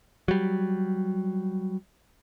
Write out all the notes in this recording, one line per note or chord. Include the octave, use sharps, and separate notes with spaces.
F#3 G3